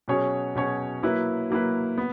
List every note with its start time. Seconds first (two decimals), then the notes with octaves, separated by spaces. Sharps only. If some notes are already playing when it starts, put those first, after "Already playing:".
0.08 B2 F#3 C#4 G#4 C#5
0.55 B2 F#3 C#4 G#4 C#5
1.02 F#3 A#3 E4 B4
1.50 F#3 A#3 E4 B4
1.98 B3